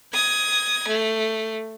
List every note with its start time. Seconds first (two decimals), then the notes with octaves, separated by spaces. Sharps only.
0.14 D#6 G#6
0.88 A3